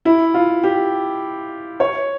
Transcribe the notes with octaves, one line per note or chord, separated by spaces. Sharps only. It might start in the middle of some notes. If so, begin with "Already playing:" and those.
E4
F4
G4
C#5